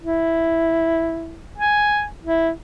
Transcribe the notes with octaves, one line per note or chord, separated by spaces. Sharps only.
E4
G#5
E4